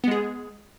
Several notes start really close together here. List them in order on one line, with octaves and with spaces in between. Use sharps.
B3 G#3 G#4